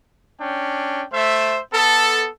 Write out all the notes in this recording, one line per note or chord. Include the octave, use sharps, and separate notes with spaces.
C#4 D4 G5
A3 C5 E5
B3 A4